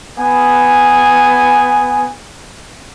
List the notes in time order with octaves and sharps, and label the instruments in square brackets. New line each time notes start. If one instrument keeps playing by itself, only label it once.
[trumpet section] B3 G#5